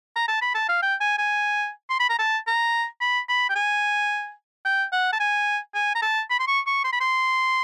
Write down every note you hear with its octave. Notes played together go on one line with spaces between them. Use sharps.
A#5
A5
B5
A5
F5
G5
G#5
G#5
C6
B5
A#5
A5
A#5
B5
B5
G5
G#5
G5
F#5
A5
G#5
G#5
A#5
A5
B5
C6
C#6
C#6
C6
B5
C6